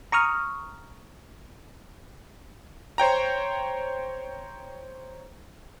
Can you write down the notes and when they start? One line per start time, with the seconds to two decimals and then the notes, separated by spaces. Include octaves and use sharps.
0.12 A#5 C#6 D#6 F6
2.98 C5 C#5 G5 A#5